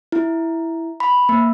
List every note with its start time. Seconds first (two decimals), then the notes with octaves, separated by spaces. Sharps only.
0.12 E4
1.00 B5
1.29 A#3